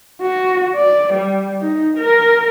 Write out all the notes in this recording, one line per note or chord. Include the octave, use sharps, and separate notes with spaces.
F#4
D5
G3
D#4
A#4